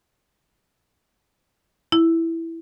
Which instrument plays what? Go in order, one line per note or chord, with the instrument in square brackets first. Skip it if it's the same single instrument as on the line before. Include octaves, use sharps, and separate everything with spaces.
[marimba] E4